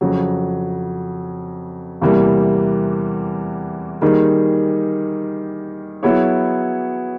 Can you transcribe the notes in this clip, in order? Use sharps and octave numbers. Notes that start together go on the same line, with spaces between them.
F2 C#3 F#3
E2 C3 E3 G3 A#3
D#3 G3 A#3 D#4 G#4
F#3 B3 E4 G#4 C#5